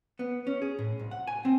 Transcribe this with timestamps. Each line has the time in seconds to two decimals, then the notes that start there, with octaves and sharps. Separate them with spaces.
0.19 B3
0.47 C#4
0.62 G#4
0.79 A2
0.99 C2
1.11 F#5
1.27 G#5
1.45 C4